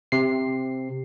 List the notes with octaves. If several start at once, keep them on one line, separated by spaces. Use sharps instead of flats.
C3 C7